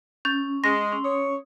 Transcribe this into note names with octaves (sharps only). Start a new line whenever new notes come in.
C#4 G6 A6
G#3 C6 A#6
C#4
C#5 D#6